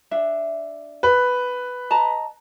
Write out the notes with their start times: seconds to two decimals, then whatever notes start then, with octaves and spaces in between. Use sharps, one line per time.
0.11 D4 E5
1.03 B4
1.90 D#5 A5 A#5